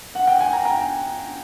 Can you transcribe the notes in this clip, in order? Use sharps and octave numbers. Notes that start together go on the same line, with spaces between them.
F#5
G5
G#5
A#5
G5